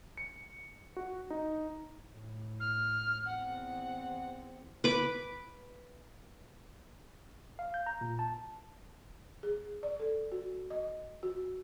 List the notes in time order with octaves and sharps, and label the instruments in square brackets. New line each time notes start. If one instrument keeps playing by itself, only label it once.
[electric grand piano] C#7
F#4
D#4
[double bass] A2
[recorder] F6
[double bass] E2 C4 [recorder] F#5
[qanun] B4 D6
[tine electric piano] F5
G6
A#5
A#2
A5
[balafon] G#4
D5
A4
F#4
D#5
F#4